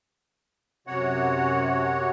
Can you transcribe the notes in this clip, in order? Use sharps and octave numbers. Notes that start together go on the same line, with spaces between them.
F#2 C3 F#4 C#5 F#5